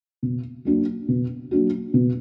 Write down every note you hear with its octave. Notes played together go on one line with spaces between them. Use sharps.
B2
F#3 A#3 D4 F#4
B2
F#3 A#3 D4 F#4
B2